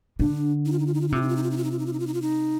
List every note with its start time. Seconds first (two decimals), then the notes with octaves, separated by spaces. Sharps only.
0.20 D3 D4
0.65 D#4
0.72 F4
0.79 D#4
0.87 F4
0.94 D#4
1.01 F4
1.09 D#4
1.12 C3 F4
1.22 D#4
1.29 F4
1.37 D#4
1.43 F4
1.51 D#4
1.57 F4
1.64 D#4
1.72 F4
1.79 D#4
1.86 F4
1.93 D#4
2.00 F4
2.07 D#4
2.14 F4
2.22 D#4